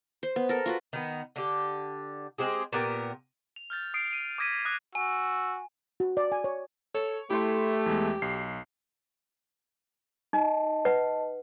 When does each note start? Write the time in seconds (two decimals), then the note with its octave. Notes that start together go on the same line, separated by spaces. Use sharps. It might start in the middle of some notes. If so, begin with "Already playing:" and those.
0.23 C5
0.36 B3
0.49 A4 A#4
0.66 F4 F#4 B4
0.93 D#3 B3
1.36 D3 G4
2.38 G#3 C4 G4 G#4
2.73 A#2 B3 G4 A#4
3.56 F7
3.70 F6 G6 A6
3.94 D#6 C7 D7
4.13 D#7
4.38 D6 D#6 G#6 A#6 B6 D#7
4.65 D6 D#6 F#6 G#6 A#6
4.95 F#4 G#5 E6
6.00 F#4
6.17 D5
6.32 G#5
6.44 C#5
6.95 A4 C#5
7.30 A3 E4 G4 C6
7.86 E2 G#3
8.22 B1 C7
10.33 D#4 D#5 A5
10.85 B4 F#5